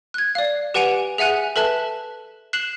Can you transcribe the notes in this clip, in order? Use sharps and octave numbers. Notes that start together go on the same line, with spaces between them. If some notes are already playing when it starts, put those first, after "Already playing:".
F#6 G#6
D5 F5
G4 B4 F#5 G#5 D7 F7
G#4 E5 F#5 G#5 F#6
A4 B4 E5 A5 F#6
F#6 C7 E7 F#7